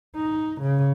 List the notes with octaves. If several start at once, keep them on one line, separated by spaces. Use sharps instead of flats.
D#4
C#3